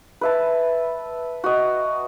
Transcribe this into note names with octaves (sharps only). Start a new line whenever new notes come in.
B4 E5 A5
F#4 D#5